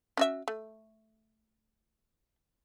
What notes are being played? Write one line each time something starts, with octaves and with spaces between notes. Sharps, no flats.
C#4 F#4 E5
A3